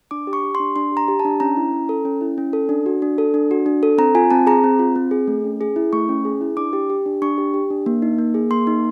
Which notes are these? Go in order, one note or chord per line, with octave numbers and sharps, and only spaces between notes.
D4 D6
G4
C#6
G4
C6
D4
D4 C6
G4 A#5
G4
A5
D4
C#4 A#5
E4
C#4
A4
C#4
E4
C#4
A4
D4
F#4
D4
A4
D4
F#4
D4
A4
C4 A#5
F4 G#5
C4 A5
G#4 A#5
C4
F4
C4
G#4
A3
C#4
G#4
E4
A3 C#6
C#4
G#4
E4
D4 D6
G4
G4
D4
D4 C#6
G4
G4
D4
A#3
D#4
A#3
G#4
A#3 C6
D#4